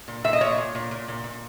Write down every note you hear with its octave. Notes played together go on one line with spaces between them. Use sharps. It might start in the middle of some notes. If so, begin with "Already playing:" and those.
A#2
A#2 E5
D#5
A#2 C#5
A#2
A#2
A#2
A#2
A#2